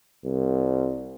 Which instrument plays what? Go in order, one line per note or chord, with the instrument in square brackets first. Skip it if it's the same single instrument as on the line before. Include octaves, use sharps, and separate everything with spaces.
[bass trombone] C2